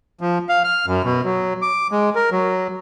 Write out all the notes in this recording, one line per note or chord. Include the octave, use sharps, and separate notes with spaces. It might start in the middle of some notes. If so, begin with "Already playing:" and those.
F3
F5
F6
F#2
B2
F#3
D6
G#3
A#4
F#3